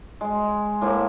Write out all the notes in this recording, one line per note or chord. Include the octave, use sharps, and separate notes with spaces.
G#3
A2 A#3 C5